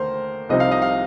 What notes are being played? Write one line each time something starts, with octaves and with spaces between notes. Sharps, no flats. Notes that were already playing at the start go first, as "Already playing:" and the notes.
Already playing: D#2 D3 A3 A#4 C5
C2 C3 F3 C4 D#4 D#5
F5
D#5
F5